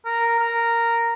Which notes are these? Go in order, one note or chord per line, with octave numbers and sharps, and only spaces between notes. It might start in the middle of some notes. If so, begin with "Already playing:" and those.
A#4
A#4